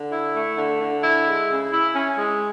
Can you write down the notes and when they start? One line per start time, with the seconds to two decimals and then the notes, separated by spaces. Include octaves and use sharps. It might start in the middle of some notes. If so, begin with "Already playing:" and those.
Already playing: D3
0.12 E4
0.35 A3
0.58 D3
0.80 D3
1.04 E4
1.26 G#3
1.50 C#3
1.73 E4
1.96 C#4
2.18 G#3